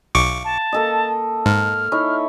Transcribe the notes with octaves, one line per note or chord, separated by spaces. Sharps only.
B1 F5 C#6 D6
A5
A#3 A4 D#5
G#2 F6
D#4 E4 C#5